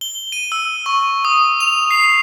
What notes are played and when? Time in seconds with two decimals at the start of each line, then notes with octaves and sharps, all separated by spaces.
0.01 G7
0.32 D#7
0.52 E6
0.86 C#6
1.25 D#6
1.61 F7
1.91 C7